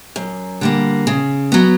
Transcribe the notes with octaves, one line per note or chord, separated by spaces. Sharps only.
F#2
D3 G3 A#3
C#3
F#3 B3